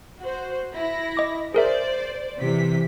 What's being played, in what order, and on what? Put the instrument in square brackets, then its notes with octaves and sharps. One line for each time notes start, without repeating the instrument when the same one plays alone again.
[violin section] F#4 C5
E4 A#6
[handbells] D#5 D6
[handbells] G#4 A#4 E5 [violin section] C5 D5
[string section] C3 E3 [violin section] B6